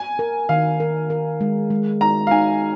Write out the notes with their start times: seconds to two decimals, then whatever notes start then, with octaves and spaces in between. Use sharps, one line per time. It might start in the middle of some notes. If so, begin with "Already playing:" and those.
Already playing: G#5
0.19 A#4
0.49 D#3 F5
0.80 A#4
1.10 A#4
1.41 G#3
1.70 G#3
2.01 D#4 A#5
2.27 F5
2.31 D#4 G#5